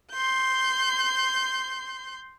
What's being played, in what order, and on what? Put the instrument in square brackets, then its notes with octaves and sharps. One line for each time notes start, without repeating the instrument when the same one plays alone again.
[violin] C6 G6